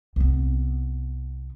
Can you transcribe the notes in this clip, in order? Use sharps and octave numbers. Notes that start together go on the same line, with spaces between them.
C2 B3